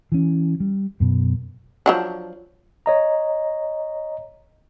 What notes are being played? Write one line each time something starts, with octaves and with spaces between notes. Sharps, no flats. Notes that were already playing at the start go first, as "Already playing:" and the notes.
E3 C#4
G3
F#2 B2
F3 F#3 D4
C#5 D#5 A#5